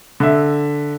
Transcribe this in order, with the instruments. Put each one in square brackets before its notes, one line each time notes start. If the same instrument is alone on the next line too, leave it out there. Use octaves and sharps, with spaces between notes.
[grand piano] D3 E5